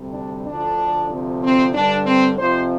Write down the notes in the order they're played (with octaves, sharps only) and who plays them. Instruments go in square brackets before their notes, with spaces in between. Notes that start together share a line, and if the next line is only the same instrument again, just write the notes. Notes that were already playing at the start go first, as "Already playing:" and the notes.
Already playing: [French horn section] D2 C3 G3
D4
D2 D3 F3 D4
D2 C3 F3
C4
G2 D3 G3 D4
C4
F2 C3 F3 C5